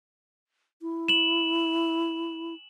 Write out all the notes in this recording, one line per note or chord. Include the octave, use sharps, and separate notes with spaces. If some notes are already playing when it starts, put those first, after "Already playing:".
E4
E7 F#7